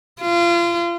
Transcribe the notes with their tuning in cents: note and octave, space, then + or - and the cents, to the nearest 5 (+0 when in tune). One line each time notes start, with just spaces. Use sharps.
F4 -30